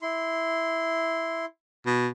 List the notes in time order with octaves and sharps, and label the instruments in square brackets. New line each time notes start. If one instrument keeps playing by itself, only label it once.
[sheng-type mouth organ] E4 C6
[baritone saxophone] B2